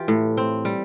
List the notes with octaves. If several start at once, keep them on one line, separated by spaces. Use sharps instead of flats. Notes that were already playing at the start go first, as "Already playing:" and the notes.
Already playing: E3 F4 G4
A2
C4
G3